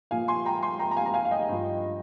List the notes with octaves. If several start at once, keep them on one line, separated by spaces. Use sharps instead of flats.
A#2 F3 F5 G#5
G#5 C6
G5 A#5
G#5 C6
G5 A#5
A#5
F5 G#5
A#5
F5 G#5
F5
D#5 G5
G2 F3